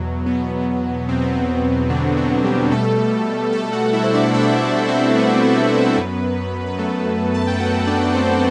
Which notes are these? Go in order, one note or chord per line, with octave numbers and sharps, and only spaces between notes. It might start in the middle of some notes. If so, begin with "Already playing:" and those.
Already playing: E2 B2 F#3
E2 B2 F#3 B3
E2 B2 F#3 C4
B3
C4
E2 B2 D3 F#3 D4
F#3 F#4
G3 G4
B2 G3 A3 A4
B2 G3 A3 A4
F#4 F#5
E4 E5
C5
D4 D5
B2 G3 E4 E5
D4 D5
C4 C5
B2 G3 B3 B4
F#2 F#3
B4
F#2 F#3 A3 A4
A5
G5
F#2 F#3 F#4 F#5
D4 D5
C4 C5